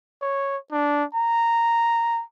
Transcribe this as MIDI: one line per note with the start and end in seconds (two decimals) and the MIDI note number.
0.22 0.57 73
0.72 1.04 62
1.15 2.22 82